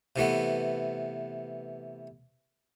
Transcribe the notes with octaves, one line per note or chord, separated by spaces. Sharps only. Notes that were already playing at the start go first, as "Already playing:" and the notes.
C3 E3 A3 B3